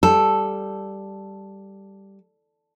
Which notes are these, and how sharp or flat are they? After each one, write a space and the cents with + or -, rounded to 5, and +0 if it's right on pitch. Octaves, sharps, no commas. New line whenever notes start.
G3 +0 A4 +0